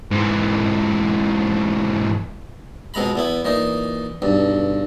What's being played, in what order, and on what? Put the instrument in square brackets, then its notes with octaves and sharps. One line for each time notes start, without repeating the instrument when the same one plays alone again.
[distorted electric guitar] G#2 E3
[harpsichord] F2 B2 G#3 A#5 B5
E2 B3 E4
A#2 E3 D#4
B1 G2